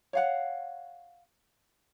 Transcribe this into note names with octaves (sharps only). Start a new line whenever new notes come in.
C#5 F5 F#5